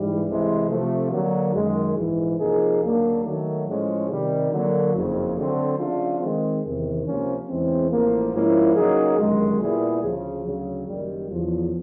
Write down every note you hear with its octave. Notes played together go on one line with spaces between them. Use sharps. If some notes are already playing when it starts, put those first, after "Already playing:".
Already playing: G#2 E3 G3
C2 C3 E3 G#3
C3 F3 A3
D3 F#3 A#3
F#2 D#3 G#3
A#1 G#2 E3
C3 F3 A#3 D#4 G#4
D2 C#3 F#3 A#3 D4
D#3 F#3 A3
A2 F3 G#3 C#4
C3 D#3 G3
D3 F#3 A#3
F#1 F2 C#3
D3 F#3 A3 C4
C#3 F3 A3 D4 F4
D#3 G#3 C4
E2 C3 D#3
C#2 C3 F3 A#3 C#4
E2 C#3 E3 G#3 C4
A1 A2 F3 A#3
G#2 F3 A#3 C#4 E4
C#3 F#3 A#3 D#4 G#4
G1 F#2 D#3 G#3
A#2 G3 B3 E4 G#4
D2 C#3 F3
D2 C#3 F#3
F#1 F#2 D#3 G3
E2 C#3 F3